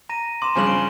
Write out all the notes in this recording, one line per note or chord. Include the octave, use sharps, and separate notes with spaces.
A#5 A#6 D#7
C6 D6 E7
G2 C#3 F3 G#5 F#7
D7 G7